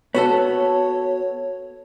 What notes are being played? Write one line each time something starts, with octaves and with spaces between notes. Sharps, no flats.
B3 F#4 A4 C#5